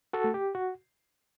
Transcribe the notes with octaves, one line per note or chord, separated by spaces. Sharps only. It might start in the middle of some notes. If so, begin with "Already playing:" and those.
F#4 A4
A3
G4
F#4